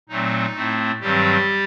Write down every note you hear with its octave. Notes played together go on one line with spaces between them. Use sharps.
A#2 F#3 A3 C4 D#4
A2 A3 C4
G2 D#3 F#3 G3 C4 G4